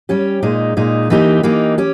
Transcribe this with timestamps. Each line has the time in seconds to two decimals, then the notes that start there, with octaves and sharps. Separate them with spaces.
0.09 G3 C#4 G4
0.43 A#2 G#3 D#4
0.77 A#2 G#3 D#4
1.10 E3 A#3 D#4 G4
1.43 E3 A#3 D#4 G4
1.78 C#4 G4